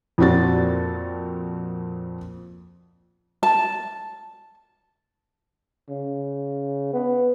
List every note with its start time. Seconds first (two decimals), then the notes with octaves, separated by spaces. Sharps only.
0.18 F2 A#2 C4 F#4 A6
3.43 A5
5.89 C#3
6.93 B3